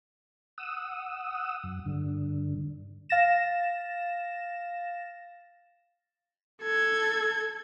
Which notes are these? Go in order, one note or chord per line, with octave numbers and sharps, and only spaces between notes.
F#5 D#6 E6
F#2
G2 D3
F5 A6 A#6 E7
A4 G#6